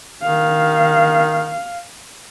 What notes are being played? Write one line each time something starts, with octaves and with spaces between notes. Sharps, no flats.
D#3 F5